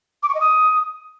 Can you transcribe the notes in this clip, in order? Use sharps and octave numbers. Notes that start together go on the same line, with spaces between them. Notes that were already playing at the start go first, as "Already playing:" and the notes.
D6
C#6
D#5
D#6